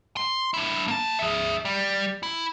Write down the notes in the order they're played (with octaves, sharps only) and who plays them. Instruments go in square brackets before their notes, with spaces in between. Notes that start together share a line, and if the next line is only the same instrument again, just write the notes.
[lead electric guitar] C6
D4 E4
A#3 A5
G#4 E5
G3
E4